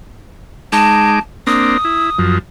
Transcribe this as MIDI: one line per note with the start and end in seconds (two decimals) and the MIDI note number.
0.72 1.19 56
0.72 1.19 63
0.72 1.19 81
0.72 1.19 86
1.47 1.77 58
1.47 1.77 60
1.47 1.77 62
1.47 2.35 87
1.85 2.10 64
2.19 2.38 42
2.19 2.38 53